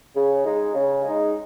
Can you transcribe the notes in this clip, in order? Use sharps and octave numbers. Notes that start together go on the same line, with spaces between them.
C#3
G#3 D#4
C#3
G#3 D#4